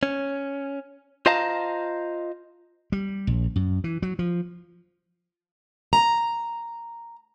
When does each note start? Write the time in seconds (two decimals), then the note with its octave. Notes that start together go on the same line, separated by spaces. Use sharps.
0.03 C#4
1.26 F4 C5 D#5 F5 A5 A#5
2.92 G3
3.27 A#1
3.56 F#2
3.84 E3
4.02 F#3
4.19 F3
5.93 A#5